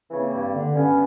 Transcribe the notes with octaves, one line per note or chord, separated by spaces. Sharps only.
C#3 E3 A#3 C4
G2
D3
G2 B3 C#4